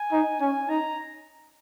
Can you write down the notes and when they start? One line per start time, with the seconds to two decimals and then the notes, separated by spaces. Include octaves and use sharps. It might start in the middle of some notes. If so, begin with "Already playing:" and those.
Already playing: G#5
0.12 D#4
0.41 C#4 G#5
0.69 D#4 A#5